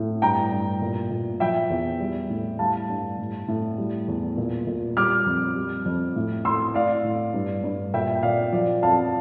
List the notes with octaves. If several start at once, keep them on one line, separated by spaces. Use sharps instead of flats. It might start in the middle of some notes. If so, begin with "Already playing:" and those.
Already playing: A2
G2 G5 A#5
G2
A#2
A#2
F3 E5 G5
E2
G3
A2
G3 F5 A5
G2
A2
A2
G3
E2
A#2
A#2
G3 D6 F6
F2
G3
F2
A2
A2 C6 E6
A2 D5 F5
A2
G2
G2
A#2 E5 G5
G5
A#2 D5 F5
F3 D5
F2 F5 A5